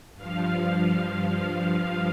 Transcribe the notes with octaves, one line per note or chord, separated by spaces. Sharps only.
G2 F3 F5